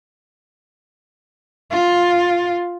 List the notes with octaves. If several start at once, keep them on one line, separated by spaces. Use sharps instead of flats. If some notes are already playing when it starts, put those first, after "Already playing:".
F4